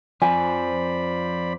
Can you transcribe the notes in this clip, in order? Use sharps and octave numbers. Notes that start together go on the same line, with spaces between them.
F2 F3 C5 D5 G#5 B5